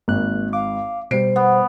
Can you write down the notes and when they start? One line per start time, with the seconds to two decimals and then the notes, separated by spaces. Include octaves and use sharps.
0.08 G#1 A#3 F#6
0.53 F5 D6
1.11 B2 G3 C5 C7 D7
1.36 B3